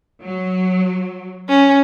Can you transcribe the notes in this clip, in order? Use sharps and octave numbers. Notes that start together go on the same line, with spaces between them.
F#3
C#4